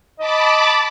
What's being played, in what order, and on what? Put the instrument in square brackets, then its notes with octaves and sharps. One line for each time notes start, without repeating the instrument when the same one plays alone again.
[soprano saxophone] D#5 [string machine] A5 B5 D6